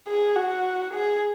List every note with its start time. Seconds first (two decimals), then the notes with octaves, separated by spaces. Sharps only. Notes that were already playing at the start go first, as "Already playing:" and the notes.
0.08 G#4
0.36 F#4
0.93 G#4